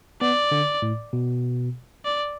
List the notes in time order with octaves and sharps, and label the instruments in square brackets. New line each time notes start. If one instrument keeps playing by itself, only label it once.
[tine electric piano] B3 [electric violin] D5
[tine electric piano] D3
A2
B2
[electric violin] D5